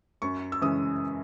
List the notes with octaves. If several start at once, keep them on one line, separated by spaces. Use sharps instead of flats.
F#2 C#6
E6
C#3 E3 G#3 C#4 D#6